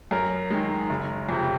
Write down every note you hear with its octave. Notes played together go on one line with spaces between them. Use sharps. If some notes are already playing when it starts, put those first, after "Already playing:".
F#2 A#4
D#3 G#3
F#1
F2 C3